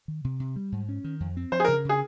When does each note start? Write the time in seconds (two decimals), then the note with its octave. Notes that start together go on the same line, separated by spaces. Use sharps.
0.08 D#3
0.24 C3
0.40 C3
0.56 G3
0.72 G#2
0.89 C#4
1.04 D#3
1.20 F2
1.37 C4
1.52 F3 C5
1.60 G#4
1.65 A#4
1.68 C#3
1.85 C#3 G#4